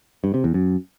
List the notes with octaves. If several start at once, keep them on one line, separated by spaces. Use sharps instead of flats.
G2
C3
E2
F#2